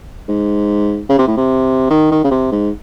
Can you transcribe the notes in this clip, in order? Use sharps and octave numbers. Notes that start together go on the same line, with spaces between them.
G#2
C#3
C3
A2
C3
D#3
D#3
C#3
C3
G#2